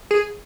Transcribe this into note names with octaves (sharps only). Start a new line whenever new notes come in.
G#4